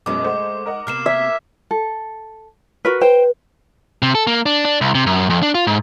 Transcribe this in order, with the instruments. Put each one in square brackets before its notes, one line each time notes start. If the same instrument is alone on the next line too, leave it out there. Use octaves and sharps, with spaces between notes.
[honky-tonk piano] F#2 B2 C#4 [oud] G#3 D#4 [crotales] D6
[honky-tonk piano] A3 C5 F#5
A#4 D#5 F#5
[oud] C3 A#3 B3 [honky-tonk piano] A#4 [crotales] F6 C7 E7
[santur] E5 [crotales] G#6 B6
[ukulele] A4
F#4 A#4 B4
[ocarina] B4 [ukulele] C5 G5
[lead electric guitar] C3
A4
A#3
D4
D4
C2
C3
F#2
F2
D4
F4
G#2